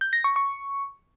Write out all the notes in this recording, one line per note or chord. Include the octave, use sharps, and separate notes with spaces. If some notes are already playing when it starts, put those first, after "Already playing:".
G6
A#6
C#6
C#6